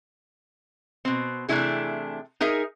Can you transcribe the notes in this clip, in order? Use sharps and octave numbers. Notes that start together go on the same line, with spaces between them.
B2 C4
C3 E3 A3 D4 E4 G#4
D#4 G#4 A#4 E5